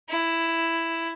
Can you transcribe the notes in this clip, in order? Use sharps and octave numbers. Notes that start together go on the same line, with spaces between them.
E4